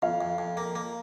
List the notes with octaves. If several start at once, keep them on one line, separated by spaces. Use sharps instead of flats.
F2 F5
F2
F2
A#3
A#3